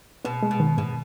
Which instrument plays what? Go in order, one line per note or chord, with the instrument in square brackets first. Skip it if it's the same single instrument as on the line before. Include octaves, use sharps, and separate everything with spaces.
[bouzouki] B2 [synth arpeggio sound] B3
[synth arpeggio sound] G#3
[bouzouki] B2
[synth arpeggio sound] D#3
[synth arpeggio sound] G#2 [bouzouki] B2